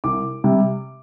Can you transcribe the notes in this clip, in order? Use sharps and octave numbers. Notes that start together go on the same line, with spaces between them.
C2 D6
C3 G3